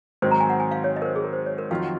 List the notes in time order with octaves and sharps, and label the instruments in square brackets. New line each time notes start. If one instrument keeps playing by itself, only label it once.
[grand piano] G#2 D#3 F#3 C4 [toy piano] C5
[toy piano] A#5
G#5
F#5
G#5
F5
C#5
D#5
A#4
C5
G#4
A#4
C5
C#5
A#4
[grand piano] F2 D#3 F#3 C4 F4 [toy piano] F5
[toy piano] F#5